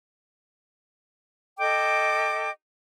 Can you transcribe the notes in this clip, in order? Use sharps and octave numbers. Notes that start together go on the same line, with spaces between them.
A4 D#5 G5 D6